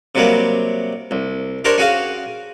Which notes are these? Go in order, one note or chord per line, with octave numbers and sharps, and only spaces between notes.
C3 F#3 G3 A#3
C2
D4 G4 A#4 C5 C#5
C#4 F#4 G#4 F5